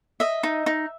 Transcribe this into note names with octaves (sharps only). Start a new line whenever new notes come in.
D#5 E5
D#4
D#4